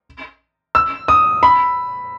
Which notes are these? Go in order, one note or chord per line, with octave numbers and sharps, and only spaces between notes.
E6
D#6
B5